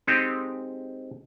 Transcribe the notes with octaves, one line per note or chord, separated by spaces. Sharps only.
G#3 C4 D#4 G4 A4